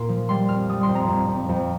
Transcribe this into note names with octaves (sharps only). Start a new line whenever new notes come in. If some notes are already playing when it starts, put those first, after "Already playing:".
Already playing: A#2 A#3 F4 C6
F3
G3 C6
F2 F6
G3 D#6
C6
F2
A#5
F2
F2
F2